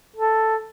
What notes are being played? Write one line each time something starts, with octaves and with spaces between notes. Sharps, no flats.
A4